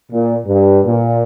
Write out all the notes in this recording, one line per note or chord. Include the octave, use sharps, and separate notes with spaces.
A#2
G2
A#2